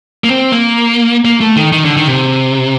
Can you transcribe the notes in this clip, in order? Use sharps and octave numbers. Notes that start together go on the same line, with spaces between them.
A#3
C4
A#3
A#3
A3
D#3
D#3
D3
D#3
C3